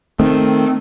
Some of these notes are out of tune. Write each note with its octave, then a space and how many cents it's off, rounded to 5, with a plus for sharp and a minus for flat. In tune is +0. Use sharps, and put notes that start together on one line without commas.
D#3 -5 A3 +0 C4 +0